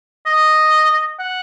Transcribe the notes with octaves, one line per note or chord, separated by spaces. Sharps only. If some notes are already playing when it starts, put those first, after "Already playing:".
D#5
F#5